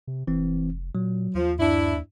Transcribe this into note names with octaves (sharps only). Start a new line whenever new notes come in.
C3
F1 E3 C4
A#2 F#3
D#2 F3
G2 D4 E4